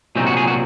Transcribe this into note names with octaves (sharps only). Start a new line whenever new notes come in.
C2 A#2 F#3 C4 D#4
F#4
G#4
F#4